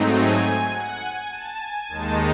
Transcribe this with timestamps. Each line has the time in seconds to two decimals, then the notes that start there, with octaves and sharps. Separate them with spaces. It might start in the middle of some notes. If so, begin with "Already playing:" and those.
Already playing: G#2 F#3 A3 C4 D#4
0.13 G#5
0.71 F#5
1.00 G#5
1.30 A5
1.58 G#5
1.87 D#2 D#3 G#3 D#4 A5